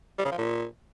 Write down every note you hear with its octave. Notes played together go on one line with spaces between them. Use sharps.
G3
C#3
F3
A#2